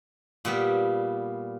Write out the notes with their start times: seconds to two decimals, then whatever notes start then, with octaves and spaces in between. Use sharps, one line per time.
0.45 A#2 G3 B3